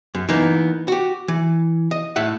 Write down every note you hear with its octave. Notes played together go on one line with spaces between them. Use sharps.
F#2
E3 A#3 B3 D#4
F#4 G4
E3
D#5
A2 E5 F#5